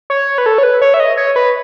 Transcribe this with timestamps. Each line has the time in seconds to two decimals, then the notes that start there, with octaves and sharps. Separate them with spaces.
0.10 C#5
0.38 B4
0.46 A4
0.58 C#5
0.63 B4
0.82 C#5
0.94 E5
1.00 D#5
1.17 C#5
1.36 B4